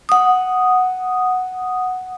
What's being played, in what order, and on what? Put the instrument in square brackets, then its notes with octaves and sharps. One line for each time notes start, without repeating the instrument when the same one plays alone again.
[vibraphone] F#5 D#6